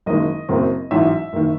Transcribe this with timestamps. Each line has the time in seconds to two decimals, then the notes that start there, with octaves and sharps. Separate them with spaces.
0.06 F#1 F#2 D#3 G#3 D#5
0.49 F#1 F#2 C#3 F#3 C4
0.91 A1 G#2 F#3 E5
1.33 F#1 D#3